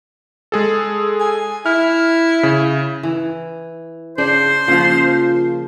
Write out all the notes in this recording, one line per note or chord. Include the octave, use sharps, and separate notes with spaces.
G#3 G#4 A4
G#5
E4 F6
C#3
E3
C#3 D4 C5
A#2 C#3 F3